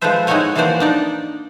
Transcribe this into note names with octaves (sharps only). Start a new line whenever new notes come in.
F3 G#3 A4 B4 C5 E5
G#3 D#4 E4 F#4 C#5 G#5
E3 F3 A#3 F#4 C5 D5
D4 D#4 D5